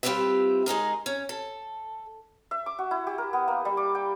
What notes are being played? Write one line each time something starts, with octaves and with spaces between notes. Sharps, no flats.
G3 C4 F4 G4 B4 E5
G#3 D#4 G#4 A#4
C#4
A4
E5
D6
F#4
E4
G4
A#4
B3
A#3
G3
D6
G5